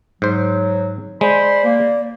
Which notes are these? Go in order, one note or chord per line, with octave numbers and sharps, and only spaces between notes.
G#2 F#3 C5
G#3 C5 D5 B5
A#3